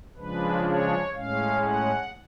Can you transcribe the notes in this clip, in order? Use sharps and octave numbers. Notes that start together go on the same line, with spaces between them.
C#3 F3 G#3 D4 B4
C#5
A2 G#3 C#4 F5
F#5